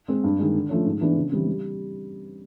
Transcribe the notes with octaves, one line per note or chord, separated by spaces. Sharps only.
G#3 C4
G2
D#3 G#3
D3
F3 A3 C#4
G#2
E3 G#3 B3 D4
C#3
E3 G3 C4
G3